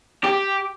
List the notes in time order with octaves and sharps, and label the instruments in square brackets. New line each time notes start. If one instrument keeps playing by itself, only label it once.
[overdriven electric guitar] G4